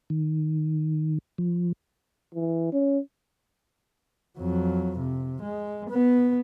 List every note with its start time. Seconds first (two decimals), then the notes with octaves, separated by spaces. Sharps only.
0.10 D#3
1.38 F3
2.35 E3
2.73 C#4
4.38 F2 F#3
4.99 C3
5.42 G#3
5.89 B3